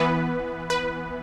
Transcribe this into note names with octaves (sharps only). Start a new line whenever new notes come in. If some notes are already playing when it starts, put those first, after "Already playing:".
Already playing: E3 B3 B4
B4